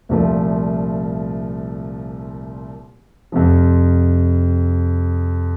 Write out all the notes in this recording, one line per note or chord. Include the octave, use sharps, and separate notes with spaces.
C2 A#2 F3 A3
F2 C3 F3